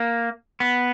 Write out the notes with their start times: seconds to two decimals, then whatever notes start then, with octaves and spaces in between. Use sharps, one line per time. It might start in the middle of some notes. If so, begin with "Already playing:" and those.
Already playing: A#3
0.60 B3